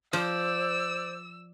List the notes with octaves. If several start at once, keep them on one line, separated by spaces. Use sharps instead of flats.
F3 C5 D5 E6